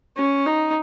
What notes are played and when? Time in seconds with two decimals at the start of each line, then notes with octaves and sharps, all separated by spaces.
0.17 C#4
0.46 D#4